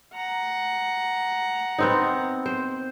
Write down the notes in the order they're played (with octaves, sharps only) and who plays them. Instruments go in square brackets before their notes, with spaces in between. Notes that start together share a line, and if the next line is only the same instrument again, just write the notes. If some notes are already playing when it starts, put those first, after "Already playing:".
[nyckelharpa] F#5 A#5
[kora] B3 C4 D#4
C5